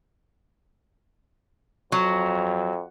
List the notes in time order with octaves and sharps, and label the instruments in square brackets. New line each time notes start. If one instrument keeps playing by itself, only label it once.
[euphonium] F2 [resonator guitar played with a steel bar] F#3